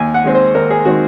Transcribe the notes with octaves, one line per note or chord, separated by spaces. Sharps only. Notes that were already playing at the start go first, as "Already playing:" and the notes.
Already playing: D#2 G#5
F#5
D#3 G#3 C4
C5
D#2 A#4
G#4
D#3 G#3 C4 F#4